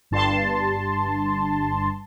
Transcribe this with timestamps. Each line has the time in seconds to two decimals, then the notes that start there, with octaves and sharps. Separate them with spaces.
0.11 G1 G2 A5 C6